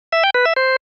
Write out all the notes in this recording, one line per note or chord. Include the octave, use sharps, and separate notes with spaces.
E5
G5
B4
E5
C5